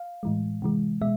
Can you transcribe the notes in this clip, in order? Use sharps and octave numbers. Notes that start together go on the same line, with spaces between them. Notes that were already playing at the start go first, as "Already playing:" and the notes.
Already playing: F5
A2 E3 G#3
C3 E3 G#3
B2 G#3 E5